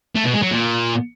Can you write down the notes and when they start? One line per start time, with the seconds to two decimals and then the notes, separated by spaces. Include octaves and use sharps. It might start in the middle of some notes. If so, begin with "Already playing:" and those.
0.16 A3
0.25 B2
0.33 G#3
0.42 F#3
0.51 A#2